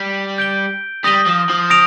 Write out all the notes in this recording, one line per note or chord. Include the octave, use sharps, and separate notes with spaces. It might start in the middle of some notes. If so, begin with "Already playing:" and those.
Already playing: G3
G6 D7 G7
G3 D#6 A#6 D#7 G7
F3
F3
D#6 A#6 D7 F7